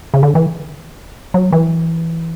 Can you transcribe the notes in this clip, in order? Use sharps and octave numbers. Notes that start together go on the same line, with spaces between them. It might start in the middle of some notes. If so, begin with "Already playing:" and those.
C#3
D3
E3
F#3
E3